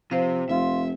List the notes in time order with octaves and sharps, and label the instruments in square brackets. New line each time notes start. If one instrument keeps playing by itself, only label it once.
[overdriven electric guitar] C3 [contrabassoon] F3 [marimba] C5 F5
[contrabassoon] F1 [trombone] F4 [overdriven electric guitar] E5